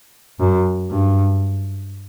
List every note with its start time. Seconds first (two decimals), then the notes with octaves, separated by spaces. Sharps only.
0.40 F#2
0.91 G2